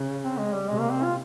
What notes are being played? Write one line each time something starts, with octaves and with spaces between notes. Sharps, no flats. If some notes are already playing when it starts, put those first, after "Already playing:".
Already playing: C#3
C4
G#3
G3
C3 G#3
A#3
C4
F4